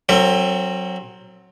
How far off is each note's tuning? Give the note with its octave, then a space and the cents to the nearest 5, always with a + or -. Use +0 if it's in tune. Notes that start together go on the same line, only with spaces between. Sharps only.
F#3 +0 C4 +20 A#4 -45